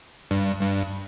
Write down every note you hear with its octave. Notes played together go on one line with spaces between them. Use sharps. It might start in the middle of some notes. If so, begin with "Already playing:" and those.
G2
G2